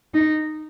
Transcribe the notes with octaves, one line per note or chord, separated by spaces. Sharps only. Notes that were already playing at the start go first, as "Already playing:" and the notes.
D#4